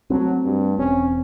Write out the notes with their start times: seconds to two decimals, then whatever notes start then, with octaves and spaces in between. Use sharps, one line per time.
0.10 F#3 A3 B3 C4
0.44 G2
0.79 E1 C4 C#4